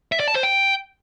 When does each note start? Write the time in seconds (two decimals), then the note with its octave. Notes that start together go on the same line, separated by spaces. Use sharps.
0.12 E5
0.20 D5
0.28 A5
0.35 C5
0.43 G5